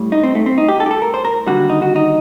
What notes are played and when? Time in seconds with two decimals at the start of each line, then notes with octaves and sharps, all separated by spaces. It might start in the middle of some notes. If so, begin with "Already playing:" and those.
Already playing: A2 G3
0.12 D#4
0.23 C4
0.35 A3
0.46 C4
0.58 D#4
0.68 G4
0.80 A4
0.86 G4
0.91 A4
1.02 A#4
1.14 C5
1.25 A#4
1.47 D#2 D3 G3 F#4
1.69 D#4
1.82 F#4
1.96 D#4